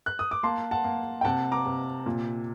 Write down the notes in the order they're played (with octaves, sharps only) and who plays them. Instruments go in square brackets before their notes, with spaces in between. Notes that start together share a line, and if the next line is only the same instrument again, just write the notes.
[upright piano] F#6
D#6
D6
A#3 A5 C6
F#5 A5
A#3
G5
C3 F#5 A5
A#5 D6
C3
A#2